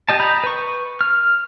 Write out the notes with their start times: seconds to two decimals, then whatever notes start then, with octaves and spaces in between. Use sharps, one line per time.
0.09 G4 D#5 A5
0.20 A#5 B5 D#6 G6
0.44 B4 C#6
1.01 F6